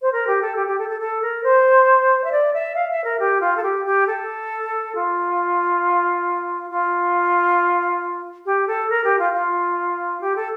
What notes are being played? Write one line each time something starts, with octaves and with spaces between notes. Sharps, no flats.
C5
A#4
G4
A4
G4
G4
A4
A4
A4
A#4
C5
E5
D5
E5
F5
E5
A#4
G4
F4
A4
G4
G4
A4
F4
F4
G4
A4
A#4
G4
F4
F4
G4
A4